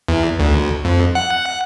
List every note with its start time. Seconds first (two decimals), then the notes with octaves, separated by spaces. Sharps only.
0.08 E2
0.39 D2
0.85 F2
1.15 F#5